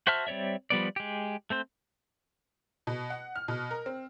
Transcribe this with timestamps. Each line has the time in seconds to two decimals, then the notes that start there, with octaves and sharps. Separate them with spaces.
0.07 F#4 C5 E5 A5 F6
0.27 G3 C4 C#5 D5 E5
0.70 F3 G3 B3 D5
0.96 G#3 G4
1.50 A3 C4 C5
2.87 B2
3.10 F#5
3.36 F6
3.48 B2
3.71 A#4
3.86 C4